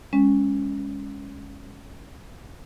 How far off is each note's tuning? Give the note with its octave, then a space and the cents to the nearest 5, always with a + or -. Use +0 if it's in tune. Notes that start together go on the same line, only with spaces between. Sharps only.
G#3 -20 C#4 +0